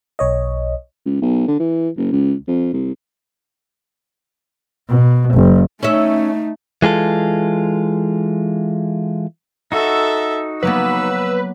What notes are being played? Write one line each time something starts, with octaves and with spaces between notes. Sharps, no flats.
B1 C#5 D#5
C#2
B1
D3
E3
F#1
C#2
F2
C2
B2
F#1
A3 C#4 D#4 E5
E3 G#3 F4 A4
D#4 F#4 A4 E5
F#3 A#3 B3 B4 E6